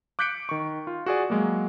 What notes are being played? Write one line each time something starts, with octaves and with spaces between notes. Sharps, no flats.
D6 F#6 G6 B6 C#7 D7
D#3 C#6
F4
F#4 G#4 D5
F#3 G#3 A#3